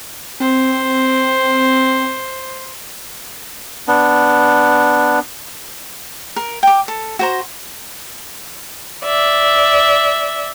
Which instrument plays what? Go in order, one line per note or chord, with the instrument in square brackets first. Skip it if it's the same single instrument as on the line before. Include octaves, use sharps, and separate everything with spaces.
[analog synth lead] C4 [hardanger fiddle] C5
[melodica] B3 D4
[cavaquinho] A#4
G5 D6
A4
F#4 C5 A#5
[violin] D5 E5